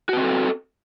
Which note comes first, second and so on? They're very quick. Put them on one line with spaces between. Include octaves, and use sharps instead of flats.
F#4 B4 C4 A4